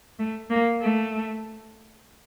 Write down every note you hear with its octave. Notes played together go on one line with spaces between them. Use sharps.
A3
A#3
A3